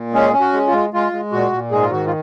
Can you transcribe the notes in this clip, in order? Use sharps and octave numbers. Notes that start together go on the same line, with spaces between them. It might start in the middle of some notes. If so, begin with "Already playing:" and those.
Already playing: A#2
G#3 C#4 G#4
C#4
F#4
G#3
F4
G#3
G#3 F4
G#3
A#2 F#4
A#2
G#2 G#3 G#4
F4
D#3 F#4
F4